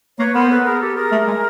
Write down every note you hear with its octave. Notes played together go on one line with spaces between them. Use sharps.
A#3 B4 C#5
B3 A#4 C5
A4 B4
G#4 A#4
G4 A4
G#4 A#4
A3
G#3